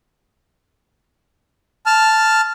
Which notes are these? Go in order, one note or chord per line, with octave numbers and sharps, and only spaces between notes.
A5 F6